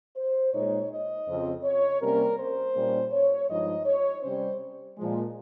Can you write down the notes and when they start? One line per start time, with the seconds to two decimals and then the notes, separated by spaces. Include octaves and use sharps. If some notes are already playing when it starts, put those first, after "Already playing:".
0.16 C5
0.53 A#2 G#3 D#4 C#5
0.90 D#5
1.27 F2 C#3 F3 C4
1.64 C#5
2.01 C3 G3 A#3 C#4 A#4
2.38 C5
2.75 A#2 G3 A#3 C#4
3.11 C#5
3.48 G2 F3 G#3 D#4 D#5
3.85 C#5
4.22 C3 G3 C#4 C5
4.97 A#2 F3 G#3